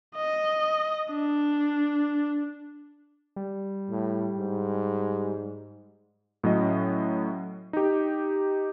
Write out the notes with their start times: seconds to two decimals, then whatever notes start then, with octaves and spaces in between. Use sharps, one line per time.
0.16 D#5
1.13 D4
3.36 G3
3.90 A2
4.38 G#2
6.44 A2 F#3 C#4 D#5
7.73 D#4 G4